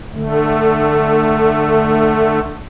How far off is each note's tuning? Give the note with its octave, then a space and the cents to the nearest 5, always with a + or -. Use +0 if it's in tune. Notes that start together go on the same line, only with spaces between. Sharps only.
D3 +25 A3 +0